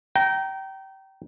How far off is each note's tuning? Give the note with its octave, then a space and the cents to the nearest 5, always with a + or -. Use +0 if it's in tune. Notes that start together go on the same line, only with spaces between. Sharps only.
G5 -25 A#5 +0